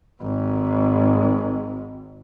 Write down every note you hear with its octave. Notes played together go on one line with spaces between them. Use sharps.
G#1 G#2